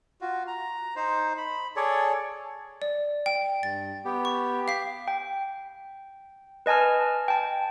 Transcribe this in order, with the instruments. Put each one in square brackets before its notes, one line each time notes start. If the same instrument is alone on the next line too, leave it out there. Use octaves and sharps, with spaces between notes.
[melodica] F4 F#4
A#5
D#4 C5
B5
G#4 A4 C#5 D5
[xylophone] D5
G5
[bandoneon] G2 [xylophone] A6
[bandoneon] B3 G4
[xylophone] C#6
[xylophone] F5 B6 [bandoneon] D6
[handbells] G5
B4 D#5 G#5 A5 F6
G5 A5